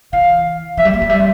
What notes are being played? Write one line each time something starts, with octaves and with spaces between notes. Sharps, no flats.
E3 F5
F3 E5
G3
A3
F3
G3 E5